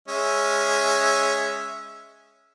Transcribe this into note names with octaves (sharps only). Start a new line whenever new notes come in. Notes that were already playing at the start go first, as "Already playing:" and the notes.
G#3 C#4 E5